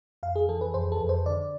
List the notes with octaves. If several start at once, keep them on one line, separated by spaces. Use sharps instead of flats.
F2 F5
G#4
E3 A4
B4
F2 C5
A4
F2
C5
D3 D5